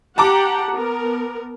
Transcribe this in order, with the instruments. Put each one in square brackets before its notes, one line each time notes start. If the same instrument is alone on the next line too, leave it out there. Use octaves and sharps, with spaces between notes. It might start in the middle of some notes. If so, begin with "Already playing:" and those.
[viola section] G4 F#5 [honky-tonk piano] A5 A#5 D6
[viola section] B3 A#4